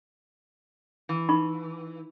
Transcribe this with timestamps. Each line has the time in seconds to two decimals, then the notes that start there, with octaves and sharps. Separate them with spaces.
1.09 E3
1.29 D#4 B5 C#6